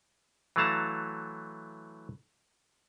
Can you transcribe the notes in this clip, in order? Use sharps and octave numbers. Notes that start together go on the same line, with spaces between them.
E3 F#3 A3 F5 A5 A#5